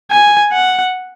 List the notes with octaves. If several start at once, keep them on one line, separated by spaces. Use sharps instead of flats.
G#5
F#5